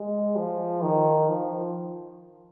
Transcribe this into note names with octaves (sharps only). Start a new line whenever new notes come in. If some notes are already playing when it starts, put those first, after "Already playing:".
Already playing: G#3
F3
D#3
F3